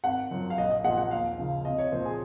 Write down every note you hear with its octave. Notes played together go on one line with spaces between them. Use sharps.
G#1 F#5
F#2 F3
F5
A#1 D#5
D#5
A#2 F3 F#5
F#5
D#2 F5
C#3 F3
C2 D#5
C#5
A#2 F3 C5
G#4